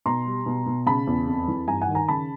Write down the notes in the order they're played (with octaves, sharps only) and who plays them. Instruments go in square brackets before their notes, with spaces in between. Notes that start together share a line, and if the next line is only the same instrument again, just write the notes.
[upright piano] B2 A#5 C6
G3
B2
B2
C#3 A5 B5
E2
F2
E3
G2 G#5 A#5
F#5 G#5
D#3
G#5 A#5
C#3 A5 B5